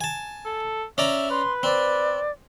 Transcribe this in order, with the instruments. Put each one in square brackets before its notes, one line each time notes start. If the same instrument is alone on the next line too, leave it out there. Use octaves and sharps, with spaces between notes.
[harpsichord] G#5 A5
[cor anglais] A4
[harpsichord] C#4 D5 A#5 [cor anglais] E5
[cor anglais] B4 [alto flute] C6
[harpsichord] C4 [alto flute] D5